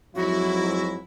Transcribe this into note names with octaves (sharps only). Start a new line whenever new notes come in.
F2 G#2 F#3 E4 F#4